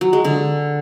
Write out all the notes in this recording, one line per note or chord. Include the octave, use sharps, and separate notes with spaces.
F#3
G#3
D3